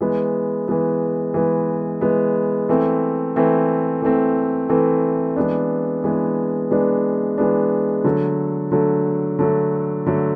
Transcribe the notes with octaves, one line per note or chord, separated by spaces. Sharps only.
E3 G#3 B3
E3 G#3 B3
E3 G#3 B3
E3 G#3 B3
E3 A3 C4
E3 A3 C4
E3 A3 C4
E3 A3 C4
E3 G#3 B3 D4
E3 G#3 B3 D4
E3 G#3 B3 D4
E3 G#3 B3 D4
D3 F#3 A3
D3 F#3 A3
D3 F#3 A3
D3 F#3 A3